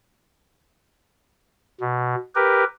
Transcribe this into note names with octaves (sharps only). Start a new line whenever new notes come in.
B2
G4 A#4 B4